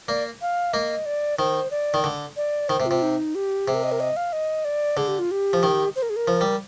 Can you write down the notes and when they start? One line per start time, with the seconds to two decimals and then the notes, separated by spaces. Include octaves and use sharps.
0.08 A#3 D5
0.42 F5
0.73 A#3 D#5
1.06 D5
1.39 D#3 C5
1.71 D5
1.94 D#3
2.04 D3
2.37 D5
2.69 D#3 C5
2.80 C3
2.86 F4
2.91 C3
3.02 D#4
3.35 G4
3.67 C3 G#4
3.75 A#4
3.83 D#5
3.92 A#4
4.00 D#5
4.16 F5
4.33 D#5
4.65 D5
4.97 D3 G#4
5.08 G4
5.19 F4
5.31 G4
5.53 F3
5.63 D#3
5.96 C5
6.02 A#4
6.10 G#4
6.16 A#4
6.28 F3
6.41 G3